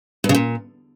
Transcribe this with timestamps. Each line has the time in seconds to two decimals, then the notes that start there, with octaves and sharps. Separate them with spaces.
0.24 G2
0.29 C#3
0.35 A#2